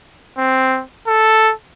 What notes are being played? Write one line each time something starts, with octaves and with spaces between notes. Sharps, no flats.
C4
A4